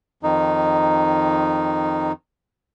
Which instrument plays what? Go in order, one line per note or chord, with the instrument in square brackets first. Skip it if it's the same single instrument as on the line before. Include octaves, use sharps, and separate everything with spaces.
[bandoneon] F2 D#3 D#4